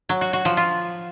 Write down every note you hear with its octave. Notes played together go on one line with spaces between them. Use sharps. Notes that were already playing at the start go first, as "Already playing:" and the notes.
F#3
F#4
F#4
F3
F4